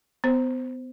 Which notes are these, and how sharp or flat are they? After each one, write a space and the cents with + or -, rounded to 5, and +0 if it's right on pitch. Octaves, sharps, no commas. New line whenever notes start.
B3 +35 C5 +0